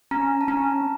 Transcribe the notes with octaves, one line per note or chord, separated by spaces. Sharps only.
C#4 A#5
A5
C#4 A#5